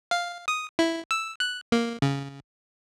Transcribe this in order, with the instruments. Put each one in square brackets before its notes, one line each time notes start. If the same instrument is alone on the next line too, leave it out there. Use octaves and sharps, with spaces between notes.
[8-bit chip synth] F5
D#6
E4
E6
F#6
A#3
C#3